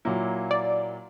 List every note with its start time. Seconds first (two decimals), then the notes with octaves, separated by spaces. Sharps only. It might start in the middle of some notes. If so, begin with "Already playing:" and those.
0.05 A#2 F#3 A#3 E4
0.51 D5